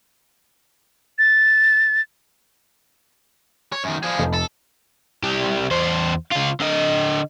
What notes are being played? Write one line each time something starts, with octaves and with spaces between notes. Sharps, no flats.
A6
C#5
F#2 D#3
F3 G#4
F1
A4
C2 G4
E2 C5
C#2 F4
D3 D#5